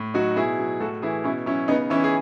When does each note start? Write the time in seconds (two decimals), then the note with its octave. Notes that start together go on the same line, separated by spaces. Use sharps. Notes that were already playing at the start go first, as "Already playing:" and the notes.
Already playing: A2
0.14 F#3 D#4 F#4
0.36 B2 E4 G#4
0.59 F#3
0.80 A2 F#4 A4
1.02 E3 E4 G#4
1.24 B2 C#4 E4
1.46 F#3 C#4 E4
1.68 C#3 B3 D#4
1.90 E3 C#4 E4
2.04 G#4